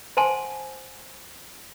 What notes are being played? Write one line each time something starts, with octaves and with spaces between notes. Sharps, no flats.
C5 F#5 G#5 A5 C6